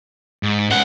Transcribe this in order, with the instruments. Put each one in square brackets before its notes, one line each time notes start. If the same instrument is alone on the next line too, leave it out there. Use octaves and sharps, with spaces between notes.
[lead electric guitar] G#2
[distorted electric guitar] C#2 F#5